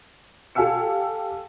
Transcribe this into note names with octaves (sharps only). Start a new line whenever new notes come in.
G4 A4 F5 G#5 E6 C#7